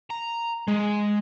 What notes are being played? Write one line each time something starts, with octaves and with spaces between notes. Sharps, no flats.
A#5
G#3